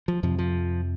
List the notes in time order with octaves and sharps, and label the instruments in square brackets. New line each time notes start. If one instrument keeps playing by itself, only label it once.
[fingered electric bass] F3
F2 C3 F3
F3